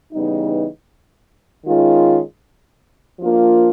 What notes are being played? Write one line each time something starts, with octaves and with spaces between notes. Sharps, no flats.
C#3 E3 G3 B3 D#4
D#3 G#3 C#4 F4
F3 A#3 D4 F4